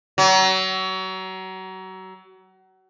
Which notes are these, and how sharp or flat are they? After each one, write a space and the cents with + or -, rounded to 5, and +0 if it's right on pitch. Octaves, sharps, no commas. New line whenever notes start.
F#3 +30